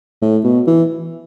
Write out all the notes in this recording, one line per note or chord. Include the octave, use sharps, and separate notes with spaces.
A2
B2
E3